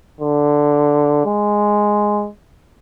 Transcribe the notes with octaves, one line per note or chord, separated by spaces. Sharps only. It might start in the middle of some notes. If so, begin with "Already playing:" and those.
D3
G#3